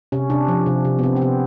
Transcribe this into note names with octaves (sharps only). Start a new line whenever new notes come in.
C3 C#4
C3 D4
F3
C3
C3
B3
C3 C4
C4
C3 B3